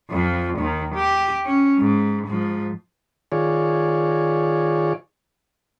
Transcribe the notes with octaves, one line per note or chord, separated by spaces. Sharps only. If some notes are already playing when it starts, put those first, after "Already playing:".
F2 F3
D#2 D#3
G4
C#4
G#2
G#2 F3
D#3 F4 G#4 C#5 D5